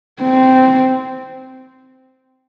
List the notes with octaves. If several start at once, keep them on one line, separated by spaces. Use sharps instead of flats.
C4